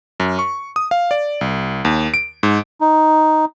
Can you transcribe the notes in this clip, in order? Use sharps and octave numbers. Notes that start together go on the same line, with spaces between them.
F#2
C#6
D#6
F5
D5
C2
D#2
D7
G#2
D#4